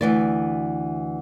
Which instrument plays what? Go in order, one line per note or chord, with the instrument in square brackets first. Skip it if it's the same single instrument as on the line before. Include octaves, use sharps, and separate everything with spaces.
[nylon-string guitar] D2 E3 D5